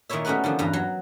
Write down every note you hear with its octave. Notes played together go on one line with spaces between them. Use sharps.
A#2 D#3 D#4 E4 C#5 E5
G3 A3 B3 C#4 F#4 B4
D3 D#3 F3
E2 G2 B4 A#5
F#3